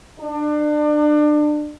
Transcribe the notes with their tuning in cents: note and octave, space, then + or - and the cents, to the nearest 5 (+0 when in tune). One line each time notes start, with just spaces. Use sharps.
D4 +30